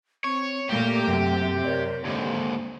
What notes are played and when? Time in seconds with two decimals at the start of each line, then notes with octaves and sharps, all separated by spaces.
0.24 C4 C#5
0.69 A#2 A3 A#3 G4 A#4
1.07 F#2 C3
1.65 A#4 C#5 D5
2.05 D#2 G#2 D3